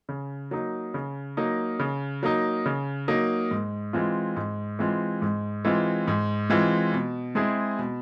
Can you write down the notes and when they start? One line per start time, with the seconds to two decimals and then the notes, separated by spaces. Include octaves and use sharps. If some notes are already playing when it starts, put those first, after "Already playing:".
0.09 C#3
0.51 F#3 A#3 D#4
0.94 C#3
1.37 F#3 A#3 D#4
1.79 C#3
2.23 F#3 A#3 D#4
2.66 C#3
3.08 F#3 A#3 D#4
3.51 G#2
3.93 E3 G#3 C4 F4
4.36 G#2
4.79 E3 G#3 C4 F4
5.22 G#2
5.65 E3 G#3 C4 F4
6.08 G#2
6.50 E3 G#3 C4 F4
6.93 B2
7.35 G#3 C4 E4 G#4
7.79 B2